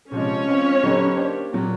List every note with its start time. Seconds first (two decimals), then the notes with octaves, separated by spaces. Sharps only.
0.12 C3 F3 G#3 C#4 C#5
0.48 G#3 C4 F4
0.83 D3 F#3 B3 D#4 G4
1.17 A#3 D4 G4 C5
1.53 A#2 F#3 A#3